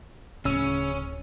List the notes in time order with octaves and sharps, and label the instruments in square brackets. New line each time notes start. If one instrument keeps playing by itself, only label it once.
[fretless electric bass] D1 [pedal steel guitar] C#3 E6 [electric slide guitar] C#4